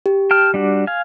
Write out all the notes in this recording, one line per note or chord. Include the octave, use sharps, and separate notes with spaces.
G4
G5 A5 F6
G3 D4 F#4
F5 G#5